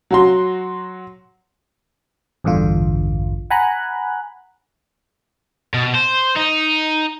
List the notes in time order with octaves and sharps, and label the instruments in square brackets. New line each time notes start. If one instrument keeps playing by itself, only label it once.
[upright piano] F#3 F#4 C6
[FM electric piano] A1 E2 G2 D3 F4
F#5 G#5 A#5 B5 F#6
[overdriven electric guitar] B2
C5
D#4